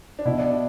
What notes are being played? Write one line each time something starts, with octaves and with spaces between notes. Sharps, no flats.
D4
B2 E4
D4